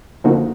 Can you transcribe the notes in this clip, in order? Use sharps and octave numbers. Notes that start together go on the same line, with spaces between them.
D3 F3 A#3 D#4 F#4